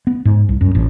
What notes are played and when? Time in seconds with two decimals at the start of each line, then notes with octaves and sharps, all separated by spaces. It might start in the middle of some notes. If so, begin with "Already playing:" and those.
0.07 B3
0.25 G#2
0.49 C2
0.61 F#2
0.75 A1